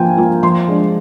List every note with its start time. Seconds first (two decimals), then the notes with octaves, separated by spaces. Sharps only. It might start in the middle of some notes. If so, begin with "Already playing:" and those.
Already playing: F3 A#3 F4 G5 G#5
0.17 A#3 F4
0.43 F3 C6
0.68 G#3 D4